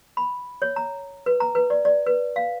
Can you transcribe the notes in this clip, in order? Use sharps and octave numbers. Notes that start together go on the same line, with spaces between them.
B5
C#5
A#5
B4
A#5
B4
D5
D5
B4
F5